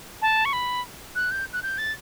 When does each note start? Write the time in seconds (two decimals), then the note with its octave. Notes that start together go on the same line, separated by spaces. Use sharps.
0.22 A5
0.45 C#6
0.53 B5
1.15 F#6
1.31 G6
1.53 F#6
1.63 G6
1.78 A6